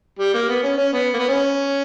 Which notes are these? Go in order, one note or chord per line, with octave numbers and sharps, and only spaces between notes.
G3
A#3
B3
C#4
C#4
B3
A#3
B3
C#4